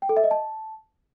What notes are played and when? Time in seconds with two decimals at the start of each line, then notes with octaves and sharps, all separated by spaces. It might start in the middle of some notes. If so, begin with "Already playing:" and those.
0.02 G5
0.09 A4
0.17 E5
0.24 D#5
0.31 A5